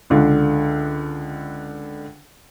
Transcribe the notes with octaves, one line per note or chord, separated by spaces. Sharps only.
C#2 D3